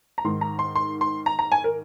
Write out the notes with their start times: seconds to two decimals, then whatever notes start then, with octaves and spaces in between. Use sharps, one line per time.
0.18 A#5
0.24 G#2 D#3 C6
0.41 A#5
0.59 C6
0.76 C6
1.01 C6
1.26 A#5
1.39 A#5
1.52 G#5
1.64 A#4